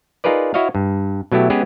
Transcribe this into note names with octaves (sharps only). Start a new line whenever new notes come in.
D#4 F4 G#4 A#4 B4 D5
E4 F#4 C#5 D#5 F5
G2
B2 F#3 A3 E4 G4
G#3 B3 C#4 G4 G#4 B4